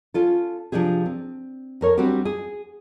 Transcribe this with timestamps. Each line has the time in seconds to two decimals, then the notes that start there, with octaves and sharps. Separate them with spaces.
0.14 C#4 F4 A4
0.72 C3 F3 D4 G4 G#4
1.06 C4
1.81 F2 A#4 C#5
1.98 G3 C4 D4 F#4 G4
2.25 G#4